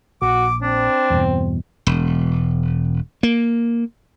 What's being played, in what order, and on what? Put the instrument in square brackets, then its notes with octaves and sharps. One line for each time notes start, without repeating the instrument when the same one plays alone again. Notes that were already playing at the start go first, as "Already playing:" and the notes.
[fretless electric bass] A#1 [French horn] F#4 [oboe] D6
[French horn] C4 [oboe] D4
[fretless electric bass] E2 G2 B2
[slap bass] E1
A#3